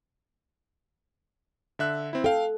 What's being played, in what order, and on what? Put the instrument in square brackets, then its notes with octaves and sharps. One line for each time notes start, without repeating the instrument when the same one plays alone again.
[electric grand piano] D3 E5 F#6
C4 E4
[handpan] A4 [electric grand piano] F5 G5